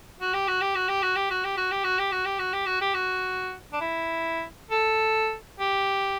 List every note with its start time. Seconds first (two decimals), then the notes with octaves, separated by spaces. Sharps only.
0.21 F#4
0.34 G4
0.48 F#4
0.62 G4
0.76 F#4
0.89 G4
1.03 F#4
1.16 G4
1.30 F#4
1.44 G4
1.57 F#4
1.72 G4
1.84 F#4
1.99 G4
2.12 F#4
2.26 G4
2.39 F#4
2.53 G4
2.66 F#4
2.81 G4
2.94 F#4
3.73 D4
3.81 E4
4.71 A4
5.60 G4